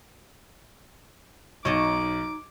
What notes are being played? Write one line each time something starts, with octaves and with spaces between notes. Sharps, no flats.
B1 D#4 C#5 D#5 A5 D6